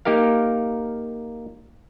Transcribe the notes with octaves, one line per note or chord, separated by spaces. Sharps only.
A#3 D#4 G4 A#4 F5